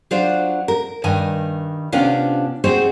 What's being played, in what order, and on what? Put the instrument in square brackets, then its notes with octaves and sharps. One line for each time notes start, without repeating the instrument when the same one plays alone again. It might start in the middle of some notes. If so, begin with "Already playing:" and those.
[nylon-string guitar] F#3 D4 F4 C5
A#4
G2 D#3 G#5
C3 B3 C#4 D4 F4
C4 D#4 F#4 G#4 C5